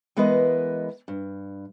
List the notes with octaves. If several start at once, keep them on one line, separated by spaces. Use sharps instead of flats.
E3 G#3 B3 A#4 B4 D#5
G2